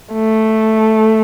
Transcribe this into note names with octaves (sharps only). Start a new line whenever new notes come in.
A3